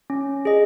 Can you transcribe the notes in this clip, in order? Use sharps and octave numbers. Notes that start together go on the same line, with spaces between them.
C#4
G#4 D#5